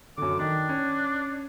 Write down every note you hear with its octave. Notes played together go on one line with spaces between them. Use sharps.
F#2 D3 D6
D#3 D4
C#4